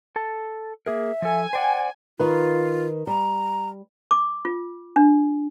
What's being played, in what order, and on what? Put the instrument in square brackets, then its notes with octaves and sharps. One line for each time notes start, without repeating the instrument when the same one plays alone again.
[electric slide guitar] A4 A5
[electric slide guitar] A#3 G#4 A#4 [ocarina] E5
[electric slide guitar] F3 A4 [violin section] G#5
[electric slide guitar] C5 D5 F#5 [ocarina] G5
[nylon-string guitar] D#3 B4 [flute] F4
[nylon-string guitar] G3 [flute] A#5
[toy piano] D6
F4
D4